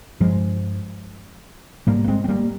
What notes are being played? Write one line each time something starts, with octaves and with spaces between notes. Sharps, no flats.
G2 F3 G#3
G#2 G3 A#3
A#3
G#3 C4
C4
G3 A#3